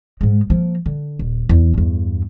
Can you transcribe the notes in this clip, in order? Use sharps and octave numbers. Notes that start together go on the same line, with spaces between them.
G#2 G#3
F3 A#3
D3
D#1
E2
E2 G2